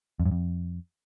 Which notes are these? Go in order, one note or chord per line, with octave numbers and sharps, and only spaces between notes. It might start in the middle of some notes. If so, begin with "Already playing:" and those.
F2
F#2
F2